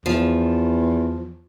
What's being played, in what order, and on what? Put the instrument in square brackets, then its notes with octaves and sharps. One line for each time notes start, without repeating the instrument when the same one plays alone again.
[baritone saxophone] E2 [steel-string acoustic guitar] F3